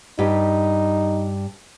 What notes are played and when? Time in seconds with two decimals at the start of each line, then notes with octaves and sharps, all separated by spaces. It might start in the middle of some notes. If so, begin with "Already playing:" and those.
0.19 G2 D#4 G4